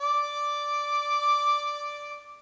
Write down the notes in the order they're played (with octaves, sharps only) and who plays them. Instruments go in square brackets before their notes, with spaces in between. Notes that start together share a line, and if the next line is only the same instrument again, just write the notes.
[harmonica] D5 D6